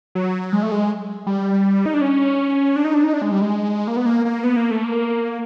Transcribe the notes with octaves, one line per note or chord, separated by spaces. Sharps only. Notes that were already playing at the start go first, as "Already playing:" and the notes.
F#3
G#3
A3
G#3
G3
D#4
D4
C#4
D4
D#4
D4
D#4
D4
G#3
G3
G#3
A#3
B3
A#3
A#3
B3
A#3
A3
A#3